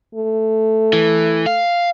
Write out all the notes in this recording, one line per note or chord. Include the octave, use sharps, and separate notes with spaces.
A3
E3
F5